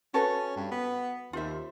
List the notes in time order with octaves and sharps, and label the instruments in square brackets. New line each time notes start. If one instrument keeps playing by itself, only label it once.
[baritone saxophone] C#4 [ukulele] F#4 A4 B4
[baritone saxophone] G2
B3
[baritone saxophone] D#2 [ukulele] F4 C5 E5